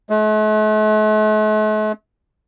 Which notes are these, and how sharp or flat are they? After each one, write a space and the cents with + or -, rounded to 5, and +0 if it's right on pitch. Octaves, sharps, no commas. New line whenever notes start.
A3 -45